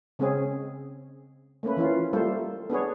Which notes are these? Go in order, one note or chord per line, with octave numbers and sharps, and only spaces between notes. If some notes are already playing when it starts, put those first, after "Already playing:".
C#3 G#3 C4 C#4 G#4
A3 A#3 C#4 B4
E3 F3 C#4 F4
G3 A3 A#3 F4 A4 C5
B3 D4 G#4 C#5